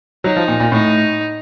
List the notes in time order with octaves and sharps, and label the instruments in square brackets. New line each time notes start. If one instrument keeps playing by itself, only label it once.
[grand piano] F#3 [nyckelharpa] D#4
[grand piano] F3
A#2
A#2
[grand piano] A2 [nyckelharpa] D#4